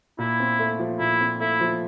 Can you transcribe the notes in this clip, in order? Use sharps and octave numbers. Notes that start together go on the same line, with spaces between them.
A#2 E4
C4
A3
F3
A#2 E4
C4
A3 E4
F3